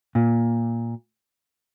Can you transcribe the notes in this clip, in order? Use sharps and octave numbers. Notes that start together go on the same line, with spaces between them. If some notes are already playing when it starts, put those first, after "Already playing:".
A#2